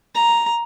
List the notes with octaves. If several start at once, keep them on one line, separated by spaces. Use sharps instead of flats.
A#5